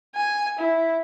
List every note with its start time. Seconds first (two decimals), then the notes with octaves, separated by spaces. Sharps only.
0.16 G#5
0.59 E4